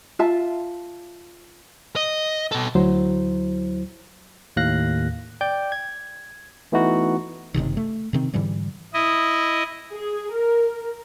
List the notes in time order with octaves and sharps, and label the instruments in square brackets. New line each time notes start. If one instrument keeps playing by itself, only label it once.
[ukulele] F4 E5 A5
[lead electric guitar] D#5
B2 A4
[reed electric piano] D2 F#3 E4 C5
[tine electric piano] D#2 A2 F5 F#6 A#6
D5 G5 D6 G6
G#6
E3 A3 B3 D#4 E4 F#4
[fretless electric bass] F#1 C2 C3 D#3
A3
C3 D#3 C4
G#2 D3 E3 G3
[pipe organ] E4 D#5
[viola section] G#4
A#4